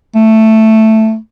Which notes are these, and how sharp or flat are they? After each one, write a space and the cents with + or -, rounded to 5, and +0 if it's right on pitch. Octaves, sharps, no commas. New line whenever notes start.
A3 +5